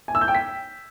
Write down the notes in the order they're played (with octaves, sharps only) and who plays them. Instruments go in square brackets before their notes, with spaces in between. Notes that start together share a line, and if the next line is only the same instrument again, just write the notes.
[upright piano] G#5
E6
G6
G5
B6